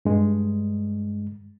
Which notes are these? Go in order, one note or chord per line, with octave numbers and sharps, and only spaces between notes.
G2 G#3